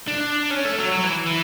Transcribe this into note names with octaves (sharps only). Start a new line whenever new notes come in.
D4
C#4
A3
F#3
F#3
E3
E3